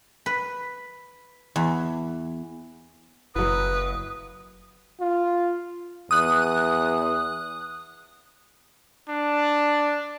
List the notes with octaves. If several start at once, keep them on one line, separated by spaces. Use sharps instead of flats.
B4
E2
F#1 F#3 E4 B4 D#6
F4
E2 D#6 F#6
D4